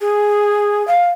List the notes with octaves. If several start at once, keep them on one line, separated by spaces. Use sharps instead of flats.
G#4
F5